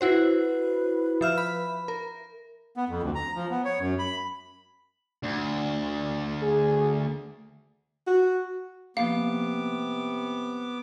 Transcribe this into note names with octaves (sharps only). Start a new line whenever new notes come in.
E4 F#4 B4 C5
F3 E5 F6
B5
A#4
B3
F2
D2
A#5
F3
B3
C#5
F#2
B5
D2
G#4
F#4
C3 F3 A#3 B3 F5 D6